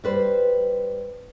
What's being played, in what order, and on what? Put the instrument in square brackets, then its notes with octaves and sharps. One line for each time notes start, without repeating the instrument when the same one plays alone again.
[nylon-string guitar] G3 B4 C5